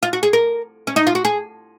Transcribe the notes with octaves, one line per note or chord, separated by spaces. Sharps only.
F4
F#4
G#4
A#4
C#4
D#4
F4
F#4
G#4